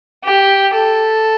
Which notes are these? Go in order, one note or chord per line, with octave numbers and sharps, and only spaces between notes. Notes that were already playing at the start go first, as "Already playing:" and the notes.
G4
A4